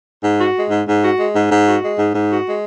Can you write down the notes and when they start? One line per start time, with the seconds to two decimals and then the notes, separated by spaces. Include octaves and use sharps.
0.22 G#2
0.39 F#4
0.54 G#3
0.70 G#2
0.86 G#2
1.02 F#4
1.17 G#3
1.34 G#2
1.50 G#2
1.66 F#4
1.81 G#3
1.97 G#2
2.13 G#2
2.29 F#4
2.45 G#3